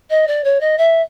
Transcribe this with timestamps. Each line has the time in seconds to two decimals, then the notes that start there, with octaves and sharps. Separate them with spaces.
0.10 D#5
0.27 D5
0.44 C#5
0.60 D#5
0.78 E5